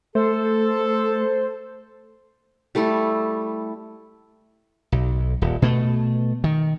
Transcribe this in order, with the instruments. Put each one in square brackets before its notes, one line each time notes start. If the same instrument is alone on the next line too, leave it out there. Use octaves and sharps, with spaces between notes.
[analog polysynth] A3 [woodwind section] A4 [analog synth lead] C5
[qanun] G3 A3 E4 A4
[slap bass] B1
D#1
B2 A3
D#3